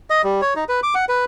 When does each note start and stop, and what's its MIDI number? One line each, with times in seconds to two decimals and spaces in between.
0.10 0.22 75
0.24 0.41 55
0.42 0.54 73
0.56 0.64 63
0.69 0.80 71
0.83 0.94 86
0.95 1.05 78
1.09 1.25 71